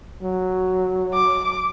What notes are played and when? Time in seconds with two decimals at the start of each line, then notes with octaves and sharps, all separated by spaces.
0.23 F#3
1.14 D6